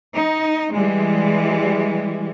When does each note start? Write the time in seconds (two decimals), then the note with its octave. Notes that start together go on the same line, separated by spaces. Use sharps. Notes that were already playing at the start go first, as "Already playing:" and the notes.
0.14 D#4
0.72 E3 G3 G#3